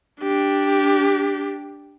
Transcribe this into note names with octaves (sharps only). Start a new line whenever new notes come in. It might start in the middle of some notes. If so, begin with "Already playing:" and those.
D4 G4